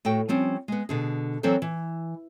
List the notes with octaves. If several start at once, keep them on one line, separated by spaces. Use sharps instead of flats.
A2 F#4 A4 G5
F3 G3 C4 C#4
G#3 B3
B2 D3 G#4
E3 F#3 C4 A4 A#4 C5
E3